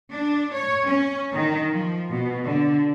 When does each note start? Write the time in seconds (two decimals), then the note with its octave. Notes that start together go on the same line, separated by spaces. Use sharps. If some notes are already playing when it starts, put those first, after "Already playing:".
0.11 D4
0.54 C#5
0.87 C#4
1.34 D#3
1.71 F3
2.10 B2
2.45 D3